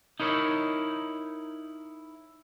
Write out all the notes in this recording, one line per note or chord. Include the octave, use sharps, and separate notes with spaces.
D#4 E4 A#4 C#5